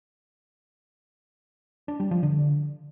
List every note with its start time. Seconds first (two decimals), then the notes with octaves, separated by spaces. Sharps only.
1.88 D4
2.00 G3
2.11 F3
2.23 D3